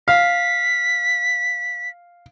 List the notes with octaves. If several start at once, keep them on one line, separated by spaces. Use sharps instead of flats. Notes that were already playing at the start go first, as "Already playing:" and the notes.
F5 B6